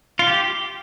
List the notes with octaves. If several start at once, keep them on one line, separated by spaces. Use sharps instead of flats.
F4
G4